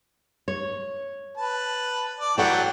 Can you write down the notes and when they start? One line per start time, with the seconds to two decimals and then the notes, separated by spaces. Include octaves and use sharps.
0.48 C#5
1.37 B4 A5
2.20 D5
2.38 E3 F#3 A4 D5 F#5 G5